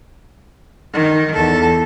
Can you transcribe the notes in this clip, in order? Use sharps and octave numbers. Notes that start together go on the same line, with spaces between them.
D#3
E2 A4